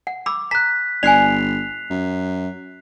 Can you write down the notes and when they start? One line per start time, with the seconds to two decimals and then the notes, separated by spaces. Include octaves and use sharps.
0.07 F#5
0.26 B5 D6 E6
0.51 A#5 F#6 B6
1.03 G1 D5 G#5 F#6 C7 F7
1.90 F#2